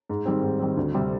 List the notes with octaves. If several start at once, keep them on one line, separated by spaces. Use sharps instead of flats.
G#2
D#3 G3 C4
G#2
D#3 G3 C4
D2
C3 G3 C4